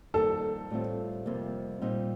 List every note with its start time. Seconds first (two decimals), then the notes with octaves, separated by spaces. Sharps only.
0.14 F2 D#3 G3 A#3 A4
0.70 A2 G3 C4 F4
1.26 F2 C3 G3 A#3
1.82 A#2 G3 C4 D#4